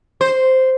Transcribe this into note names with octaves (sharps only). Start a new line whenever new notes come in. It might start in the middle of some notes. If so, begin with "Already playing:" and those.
C5